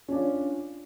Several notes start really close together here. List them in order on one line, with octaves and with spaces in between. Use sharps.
C#4 D4 F4